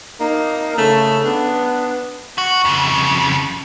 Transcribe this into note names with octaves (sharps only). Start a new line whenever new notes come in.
A#3 D#4
C#3 A3
B3 D4
F#4
F2 C#3